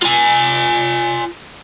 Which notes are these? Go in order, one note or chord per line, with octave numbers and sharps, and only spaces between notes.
F4 G#5